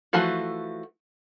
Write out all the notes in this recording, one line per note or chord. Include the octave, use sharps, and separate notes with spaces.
E3 F3 A3 F#4